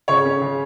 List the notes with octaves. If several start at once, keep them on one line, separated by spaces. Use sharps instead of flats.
C#3 C#5
C#4
C#3